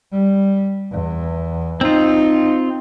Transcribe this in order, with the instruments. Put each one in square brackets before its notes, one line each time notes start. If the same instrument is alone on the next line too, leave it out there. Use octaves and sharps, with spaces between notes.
[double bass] G3
E2
[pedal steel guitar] C4 F4 [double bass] D#4